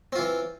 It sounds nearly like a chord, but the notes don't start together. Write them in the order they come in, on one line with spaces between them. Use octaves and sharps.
C4 F4 E3